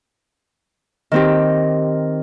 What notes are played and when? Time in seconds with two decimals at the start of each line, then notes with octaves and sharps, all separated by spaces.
1.12 D#3 C4 G4